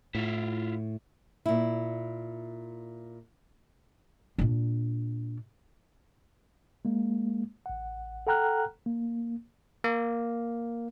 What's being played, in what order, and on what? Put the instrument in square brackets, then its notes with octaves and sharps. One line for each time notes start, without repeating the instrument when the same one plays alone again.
[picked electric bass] A2 [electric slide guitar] E4 F4
[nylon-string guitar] A#2 E4
[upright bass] A#2 D4
[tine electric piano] G#3 A#3
A1 F#5
A4 F#5 G5 A#5 F6 F#6
A#3
A#3